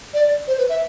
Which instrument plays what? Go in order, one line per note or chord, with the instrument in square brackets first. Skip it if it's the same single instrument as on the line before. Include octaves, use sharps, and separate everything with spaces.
[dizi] D5
C5
B4
E5